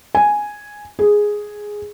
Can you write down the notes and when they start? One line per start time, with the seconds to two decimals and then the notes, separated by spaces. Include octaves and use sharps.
0.15 G#5
0.99 G#4